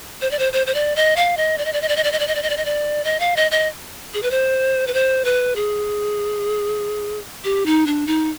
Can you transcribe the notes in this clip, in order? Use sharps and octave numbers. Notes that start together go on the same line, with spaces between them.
C5
D5
C5
C5
C5
D5
D#5
F5
D#5
D5
D#5
D5
D#5
D5
D#5
D5
D#5
D5
D#5
D5
D#5
D5
D#5
D5
D#5
F5
D#5
D#5
G#4
B4
C5
B4
C5
B4
G#4
G4
D#4
D4
D#4